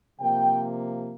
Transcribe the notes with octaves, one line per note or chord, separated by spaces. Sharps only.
C3 F3 A#3 G5